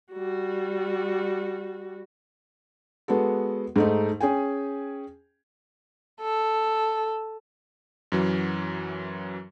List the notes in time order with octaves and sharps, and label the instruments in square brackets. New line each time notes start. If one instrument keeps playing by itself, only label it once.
[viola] G3 F#4
[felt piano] G#3 B3 F#4 A4
G#2 A3 D#4
C#4 G#4 G5 G#5
[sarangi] A4
[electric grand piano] F#2 E3 F#3